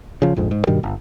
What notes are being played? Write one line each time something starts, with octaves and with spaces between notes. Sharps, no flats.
C#3 F3
A#1 F2 G#2
G#2
G2 B2 D#3 G3
G1